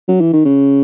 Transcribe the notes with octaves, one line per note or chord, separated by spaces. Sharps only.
F#3
E3
D#3
C#3